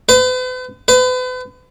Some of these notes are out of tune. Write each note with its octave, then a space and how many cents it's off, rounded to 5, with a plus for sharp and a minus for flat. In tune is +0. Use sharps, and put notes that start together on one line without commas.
B4 +45
B4 +40